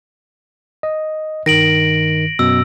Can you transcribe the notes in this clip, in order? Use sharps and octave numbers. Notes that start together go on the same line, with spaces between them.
D#5
G2 D#3 A#6 D7 F#7
F#2 B2 E6